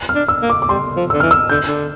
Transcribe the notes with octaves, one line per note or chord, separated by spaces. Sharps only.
F6
D4
E6
A#3
D6
D6
G3 C6
F3
D3 E6
E3 F6
E6
D3 G6
D3